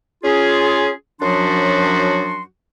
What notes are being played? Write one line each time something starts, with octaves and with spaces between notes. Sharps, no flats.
C#4 F4 G#4
F#2 F3 F#3 D4 F#4 C6